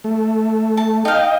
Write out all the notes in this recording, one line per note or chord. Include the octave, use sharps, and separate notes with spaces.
A3
A5
D#4 D#5 F5 G5